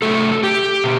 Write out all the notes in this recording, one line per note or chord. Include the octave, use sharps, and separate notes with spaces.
C3 F#3 A3 A4
G4
B2